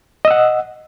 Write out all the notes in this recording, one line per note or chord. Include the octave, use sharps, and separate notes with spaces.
D#5 F#5 E6